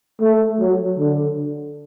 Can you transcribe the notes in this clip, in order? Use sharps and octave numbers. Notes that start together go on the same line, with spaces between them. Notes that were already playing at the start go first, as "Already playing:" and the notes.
A3
F#3
D3